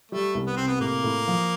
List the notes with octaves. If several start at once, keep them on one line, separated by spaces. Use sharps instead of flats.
G3 A3
C2
B3
C3 C4
B3
A2 A#3
A2
F3